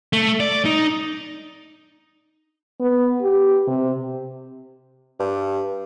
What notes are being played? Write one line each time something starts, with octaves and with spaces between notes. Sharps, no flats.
A3
D5
D#4
B3
G4
C3
G2